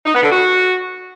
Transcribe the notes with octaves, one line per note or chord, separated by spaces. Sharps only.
D#4
B3
D3
F#4